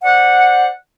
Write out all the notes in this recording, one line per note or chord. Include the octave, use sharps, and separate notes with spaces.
C5 D5 F#5